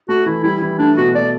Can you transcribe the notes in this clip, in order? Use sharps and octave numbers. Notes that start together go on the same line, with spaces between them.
A3 F#4
E3 E4
G3 E4
E3 E4
A3 D4
B2 F#4
A3 D5